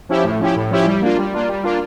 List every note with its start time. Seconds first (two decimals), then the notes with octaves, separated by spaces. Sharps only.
0.09 F3 C#4 E4 G4
0.24 A2
0.39 F3 C#4 E4 G4
0.56 A2
0.71 F3 C#4 E4 G4
0.86 G3
1.01 A#3 D4 F4
1.18 G3
1.33 A#3 D4 F4
1.49 G3
1.64 A#3 D4 F4